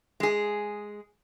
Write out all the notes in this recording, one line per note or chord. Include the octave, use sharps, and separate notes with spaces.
G#3 G#4